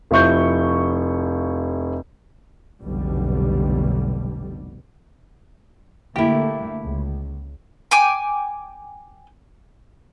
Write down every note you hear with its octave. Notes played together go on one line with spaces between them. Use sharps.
F1 F3 E4 C#6 G6
F1 B1 B2 D3 G3
D3 A3 A#3 E4 G4
C#2
G5 G#5 D6